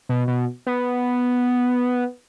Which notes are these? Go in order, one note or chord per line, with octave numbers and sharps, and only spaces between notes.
B2
B2
B3